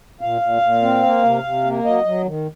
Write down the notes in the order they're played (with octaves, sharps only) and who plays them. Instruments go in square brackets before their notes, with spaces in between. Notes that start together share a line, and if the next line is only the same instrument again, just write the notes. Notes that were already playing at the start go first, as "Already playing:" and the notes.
[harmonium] A#2 F5
A#2
A#2
C4
A#3
C3
C3
A#3
F#3 D#5
F#3
D#3